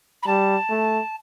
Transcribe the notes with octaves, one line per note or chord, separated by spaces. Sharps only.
B5
G3 A5
A3